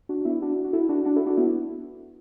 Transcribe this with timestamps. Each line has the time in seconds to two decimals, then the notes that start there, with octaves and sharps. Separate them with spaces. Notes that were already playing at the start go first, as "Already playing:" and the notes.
0.09 D4 F#4
0.21 D4
0.25 B3 E4
0.42 D4 F#4
0.64 F#4
0.73 E4 A4
0.89 D4 F#4
1.05 D4 F#4
1.16 E4 A4
1.26 D4 F#4
1.37 B3 E4